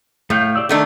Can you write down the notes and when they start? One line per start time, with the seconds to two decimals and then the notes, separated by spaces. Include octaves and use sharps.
0.30 A2 A3 F5 G6
0.55 G4 D5 E6
0.69 D#3 A3 D4 D#5